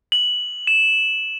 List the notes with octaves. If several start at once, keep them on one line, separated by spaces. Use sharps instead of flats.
F#7
E7